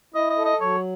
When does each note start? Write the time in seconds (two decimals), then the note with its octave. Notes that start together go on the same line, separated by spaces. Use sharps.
0.14 E4 D#5
0.30 D#5
0.37 A4
0.45 D#5
0.61 F#3 C#5